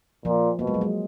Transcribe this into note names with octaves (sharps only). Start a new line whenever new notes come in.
A#2 F3
B2 A#3
G#3
F#3
G#3